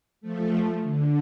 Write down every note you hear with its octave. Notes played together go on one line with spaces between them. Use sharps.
F3 A3
D3